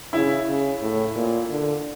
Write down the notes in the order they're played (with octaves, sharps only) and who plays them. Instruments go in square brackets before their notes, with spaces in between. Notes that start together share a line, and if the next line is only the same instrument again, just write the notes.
[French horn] C#3 [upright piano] E4
[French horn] C#3
A2
A#2
D3